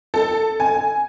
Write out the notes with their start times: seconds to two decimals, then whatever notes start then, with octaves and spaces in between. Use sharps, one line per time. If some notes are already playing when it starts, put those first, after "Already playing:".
0.14 A4
0.60 G#5